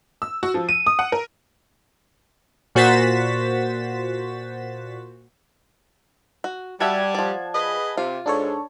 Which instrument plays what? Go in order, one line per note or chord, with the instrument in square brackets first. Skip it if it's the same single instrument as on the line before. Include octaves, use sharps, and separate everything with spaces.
[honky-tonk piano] E6
F#4
F3
D#7
D#6
F#5
A#4
[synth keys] A#2 F#4 C5 A6 B6 E7
[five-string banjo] F#4
[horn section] G3 [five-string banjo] F#4 E5 [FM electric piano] F#5 A5 G#6
[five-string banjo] F3 D5
[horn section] G#4 B4 D#5
[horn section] C3 [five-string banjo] F4
[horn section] G#2 [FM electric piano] D4 A4 C#5